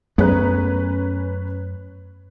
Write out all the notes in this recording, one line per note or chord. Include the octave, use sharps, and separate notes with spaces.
F#2 A3 B3 C#4 B4 A#5